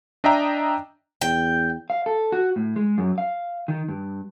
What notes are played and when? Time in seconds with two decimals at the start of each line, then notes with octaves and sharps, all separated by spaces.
0.24 D4 D#5 E5 G5 A#5
1.21 E2 G5
1.90 F5
2.06 A4
2.32 F#4
2.56 A2
2.76 G#3
2.98 F#2
3.18 F5
3.68 D#3
3.88 G2